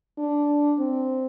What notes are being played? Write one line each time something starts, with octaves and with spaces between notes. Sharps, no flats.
D4
C4